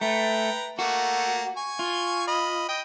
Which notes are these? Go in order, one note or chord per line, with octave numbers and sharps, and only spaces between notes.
A3 B4 G5 A#5
A3 A#3 F#4
G#5 C#6
F4
D#5 B5
D#5 G5